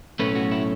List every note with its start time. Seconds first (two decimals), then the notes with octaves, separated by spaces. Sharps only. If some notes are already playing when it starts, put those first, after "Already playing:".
0.19 B1 A2 A3 C#4 B4
0.35 F#4
0.51 E4